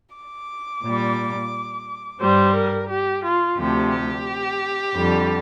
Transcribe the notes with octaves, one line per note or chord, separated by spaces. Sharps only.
D6
A#2 G3
G2 G3 C5
A#4
G4
F4
D2 C3 F3 G4
G4
F2 D3 G3